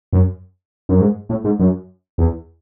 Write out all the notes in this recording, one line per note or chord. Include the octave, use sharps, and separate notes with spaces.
F#2
F#2
G#2
A2
G#2
F#2
E2